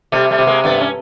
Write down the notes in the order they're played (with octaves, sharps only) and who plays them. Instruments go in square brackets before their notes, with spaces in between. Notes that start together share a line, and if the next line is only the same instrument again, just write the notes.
[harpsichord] C3 [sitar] G3 A3
[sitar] G3 A3
[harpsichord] C3
[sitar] G#3 A#3
[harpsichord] G2 [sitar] A3 B3
[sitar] C#4